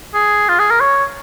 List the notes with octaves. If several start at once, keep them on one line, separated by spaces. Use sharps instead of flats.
G#4
F4
G#4
A#4
C#5